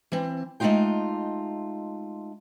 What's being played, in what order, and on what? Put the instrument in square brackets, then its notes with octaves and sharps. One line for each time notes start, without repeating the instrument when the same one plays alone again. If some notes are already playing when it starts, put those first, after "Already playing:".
[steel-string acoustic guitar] E3 C4
G#3 A3 C#4 D#4 F4 G5